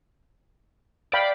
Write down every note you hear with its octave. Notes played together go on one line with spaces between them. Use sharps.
D5 F5 G5 B5